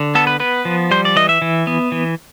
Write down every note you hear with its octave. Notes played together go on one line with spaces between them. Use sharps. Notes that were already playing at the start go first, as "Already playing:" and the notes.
Already playing: D3
B3 A4
B4
B3 B4
F3
G3 C5
D5
E3 D#5
E5
E3
B3
E3